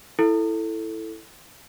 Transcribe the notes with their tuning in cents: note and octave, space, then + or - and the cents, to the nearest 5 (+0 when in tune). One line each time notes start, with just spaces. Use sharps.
E4 +0 A4 +0